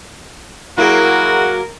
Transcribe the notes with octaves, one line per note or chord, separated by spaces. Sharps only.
F#3 A#3 E4 F#4 G#4 A#4